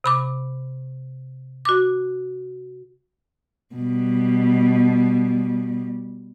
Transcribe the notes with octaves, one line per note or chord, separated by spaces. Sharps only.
C3 B5 D6
F#4 D6
B2 G3